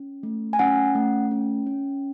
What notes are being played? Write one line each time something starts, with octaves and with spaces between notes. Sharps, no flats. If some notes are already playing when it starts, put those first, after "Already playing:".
Already playing: C#4
A3
G#5
C#4 F#5
A3
C#4
C#4